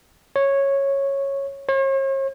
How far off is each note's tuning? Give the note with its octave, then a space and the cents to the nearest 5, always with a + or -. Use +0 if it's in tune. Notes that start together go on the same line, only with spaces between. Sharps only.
C#5 -10
C#5 -45